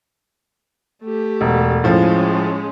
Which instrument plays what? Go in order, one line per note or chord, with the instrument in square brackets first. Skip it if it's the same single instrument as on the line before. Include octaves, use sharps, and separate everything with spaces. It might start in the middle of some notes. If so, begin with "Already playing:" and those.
[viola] A3 G4
[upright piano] E1
[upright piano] A2 F3 [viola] G#3 C#4